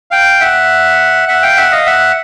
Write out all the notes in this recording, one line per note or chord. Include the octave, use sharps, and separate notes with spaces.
F5 G5
E5 F#5
E5 F#5
F5 G5
E5 F#5
D#5 F5
E5 F#5